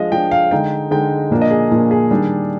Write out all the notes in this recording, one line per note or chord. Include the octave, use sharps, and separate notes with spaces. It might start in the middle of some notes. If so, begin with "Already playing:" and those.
Already playing: F3 G#3 D4 D#5 F5
F3 G#3 D4 G5
F5
D3 G#3 D#4 G5
D3 G#3 D#4 G5
A#2 F3 A#3 D4
D#5
G#4
A#2 F3 A#3 D4
G#4
D#3 G3 D4